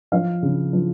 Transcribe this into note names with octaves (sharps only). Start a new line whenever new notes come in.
F3 F5
C#3
F3